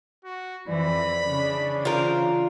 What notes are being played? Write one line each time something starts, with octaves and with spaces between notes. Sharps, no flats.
F#4
F2 E3 D5 B5
C#3 E3 D4
F4 A#4 C5